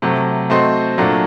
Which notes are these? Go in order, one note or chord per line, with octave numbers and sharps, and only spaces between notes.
C3 F#3 A3
A3 C4 F#4 C5 D#5
A#2 F#3 A3 D4